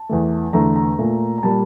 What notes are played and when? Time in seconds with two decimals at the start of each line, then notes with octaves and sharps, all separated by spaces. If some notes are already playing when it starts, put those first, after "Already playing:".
Already playing: A5
0.09 E2 E3 A3
0.53 E2 D3 A3 A#5
0.76 A#5
0.99 A#2 A3
1.38 A#5
1.43 A#2 G3 A#3 A5